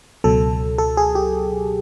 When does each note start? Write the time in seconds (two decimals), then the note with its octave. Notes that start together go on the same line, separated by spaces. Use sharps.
0.24 C#2 B2 F#3 A4
0.78 A4
0.97 G#4
1.15 G4